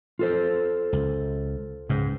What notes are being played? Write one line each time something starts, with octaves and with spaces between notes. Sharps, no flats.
F4 A4 C5
C#2
C#2 G#2